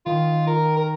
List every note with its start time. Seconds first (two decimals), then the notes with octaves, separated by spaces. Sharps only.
0.06 D#3 F4
0.47 A#4
0.77 A#4